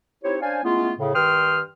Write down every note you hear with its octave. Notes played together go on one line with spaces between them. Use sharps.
C4 D#4 E4 G4 C5 C#5
C#4 D4 C5 D5 F5 G#5
G#3 A3 B3 C#4 E4 F4
A2 C#3
G2 D#3 G5 C6 D#6 F6